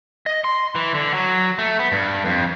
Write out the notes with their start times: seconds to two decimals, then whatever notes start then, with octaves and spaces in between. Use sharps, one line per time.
0.26 D#5
0.44 C6
0.75 E3
0.95 D3
1.14 F#3
1.59 A3
1.79 B3
1.92 G2
2.25 F2